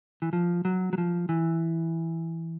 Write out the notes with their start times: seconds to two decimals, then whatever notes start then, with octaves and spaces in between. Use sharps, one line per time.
0.22 E3
0.33 F3
0.65 F#3
0.93 F#3
0.98 F3
1.29 E3